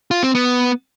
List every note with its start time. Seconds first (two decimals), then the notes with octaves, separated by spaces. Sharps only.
0.11 F4
0.23 C4
0.35 B3